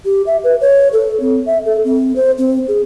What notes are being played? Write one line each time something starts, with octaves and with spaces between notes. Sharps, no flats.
G4
E5
B4
C#5
A4
C4
E5
A4
C4
C5
C4
G#4